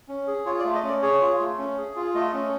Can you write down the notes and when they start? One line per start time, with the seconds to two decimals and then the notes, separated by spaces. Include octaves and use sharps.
0.08 C#4
0.27 G#4
0.46 F4 C#5
0.59 D5
0.65 A3
0.74 D#5
0.83 C#4 D5
1.02 G#4 C#5
1.21 F4
1.40 A3
1.58 C#4
1.78 G#4
1.96 F4
2.15 A3 D#5
2.33 C#4